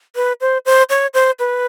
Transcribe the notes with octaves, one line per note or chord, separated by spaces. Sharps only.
B4
C5
C5
C#5
C5
B4